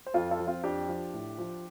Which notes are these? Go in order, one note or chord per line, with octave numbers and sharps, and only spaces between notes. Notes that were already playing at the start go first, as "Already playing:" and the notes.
C5
F2 F4 A4
F4 A4
F3
C4 F4
F2 D4 G4
F3
A2
F3